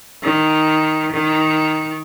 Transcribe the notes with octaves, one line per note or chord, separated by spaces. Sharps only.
D#3
D#3